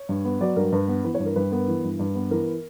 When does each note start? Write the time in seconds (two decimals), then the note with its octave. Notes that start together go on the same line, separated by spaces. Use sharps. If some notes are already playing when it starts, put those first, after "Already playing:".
Already playing: C#5
0.09 G2
0.25 B3
0.41 F#3 D5
0.56 G2 A#4
0.72 G2 B4
0.88 B3
1.04 E3 B4
1.15 C#5
1.20 G2
1.26 A#4
1.36 G2 B4
1.52 B3 A#4
1.68 E3
1.84 G2
1.99 G2
2.15 B3
2.31 E3 A#4